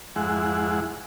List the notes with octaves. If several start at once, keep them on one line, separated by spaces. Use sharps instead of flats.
F2 G#2 G#3 E4 F#5